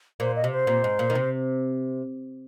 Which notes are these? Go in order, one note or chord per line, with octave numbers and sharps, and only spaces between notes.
A#2 C5
D#5
C3
C5
A#2
G#2
A#2
D#3
C3